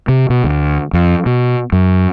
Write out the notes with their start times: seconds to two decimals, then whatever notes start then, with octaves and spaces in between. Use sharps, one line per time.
0.08 C3
0.30 B2
0.44 D2
0.93 F2
1.26 B2
1.72 F#2